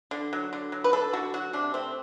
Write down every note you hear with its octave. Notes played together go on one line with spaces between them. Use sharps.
D3
F#3
D3
F#3
B4
D3 A4
D3 F#4
F#3 F#4
C3 D4
A3 C4